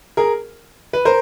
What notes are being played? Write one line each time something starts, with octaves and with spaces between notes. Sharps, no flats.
G#4 A#4
B4
A#4 C5